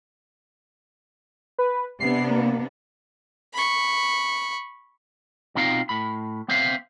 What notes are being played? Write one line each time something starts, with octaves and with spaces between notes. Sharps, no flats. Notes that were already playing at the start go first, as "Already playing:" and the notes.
B4
C3 B3 D4 C7
A#3
B5 C#6
B2 C4 D#4 F4 F5 G5
A2 B5
B3 C4 C5 E5 F5